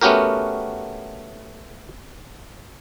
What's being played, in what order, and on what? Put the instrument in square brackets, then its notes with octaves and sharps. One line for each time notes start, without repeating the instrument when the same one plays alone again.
[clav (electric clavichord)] A3 B3 C#4 F#4 G4 A#4